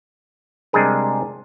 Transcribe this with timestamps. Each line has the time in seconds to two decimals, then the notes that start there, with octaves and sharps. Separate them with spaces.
0.73 C3 G3 G#3 D4 G#4 A#4